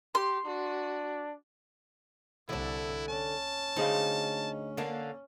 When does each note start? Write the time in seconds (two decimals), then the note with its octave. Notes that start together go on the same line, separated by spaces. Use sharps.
0.15 G4 C6
0.46 D4 F#4
2.49 C2 D3 D4 E4
3.08 C#4 A5
3.76 D2 D#4 G#4 C5 F5
4.77 D3 A#3 D4